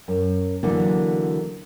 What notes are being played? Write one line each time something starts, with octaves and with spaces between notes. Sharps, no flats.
F#2
D3 E3 F#3 A#3